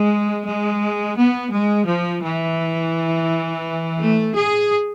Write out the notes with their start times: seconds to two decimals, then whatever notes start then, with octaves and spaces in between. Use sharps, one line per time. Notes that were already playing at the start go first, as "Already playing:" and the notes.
Already playing: G#3
0.46 G#3
1.17 B3
1.53 G#3
1.87 F3
2.23 E3
3.99 A3
4.35 G#4